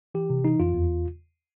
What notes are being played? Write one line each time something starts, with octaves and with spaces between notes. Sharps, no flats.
E3 G4
C3
E3 D#4
F2 F4
E2